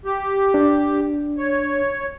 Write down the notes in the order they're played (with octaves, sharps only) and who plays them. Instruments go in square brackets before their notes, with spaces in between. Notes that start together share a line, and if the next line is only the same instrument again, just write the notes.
[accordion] G4
[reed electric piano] D4
[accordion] C#5